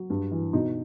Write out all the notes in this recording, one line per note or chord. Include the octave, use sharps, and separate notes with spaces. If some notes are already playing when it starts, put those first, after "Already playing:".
Already playing: F#3
G2
E3
B2 D#4